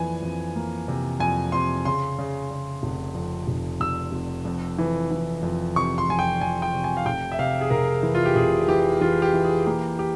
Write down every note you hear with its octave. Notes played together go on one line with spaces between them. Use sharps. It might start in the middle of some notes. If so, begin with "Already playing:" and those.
Already playing: F2 E3 A#3 G#5
F2
A#3
C3
F2 G#5
C3 C6
C#3 C6
C#3
C#3
F1
F2
F1
F1 E6
F1
F2
E3
E3
F2
C3 C#6
C6
F2 G#5
G5
F2 G#5
G5
C3
G#5
F5
F1 G5
E5
C3 F5
G#4
F1 A#4
E3
F4
G4
F1 G#4
E3 G4
E3 F4
G4
E3
G#4
A#3 G4
G4